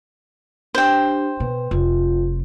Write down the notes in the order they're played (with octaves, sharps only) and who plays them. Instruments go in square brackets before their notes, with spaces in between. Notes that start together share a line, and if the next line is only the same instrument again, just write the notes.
[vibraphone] D4 G4 [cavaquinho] C5 G5
[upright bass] B2 [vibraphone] B4
[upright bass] F1 [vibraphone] F4